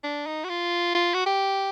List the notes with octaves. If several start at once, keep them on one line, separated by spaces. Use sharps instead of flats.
D4
D#4
F#4
F4
F4
F#4
G4